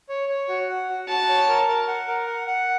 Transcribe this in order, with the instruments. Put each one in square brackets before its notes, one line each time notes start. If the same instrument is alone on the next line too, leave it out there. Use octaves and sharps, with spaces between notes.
[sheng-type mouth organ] C#5
C#5
F#4
F#5
F#4
[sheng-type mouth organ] F#4 [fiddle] A5
[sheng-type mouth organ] C#5
A#4
A#4
F#5
A#4
F#5
F#5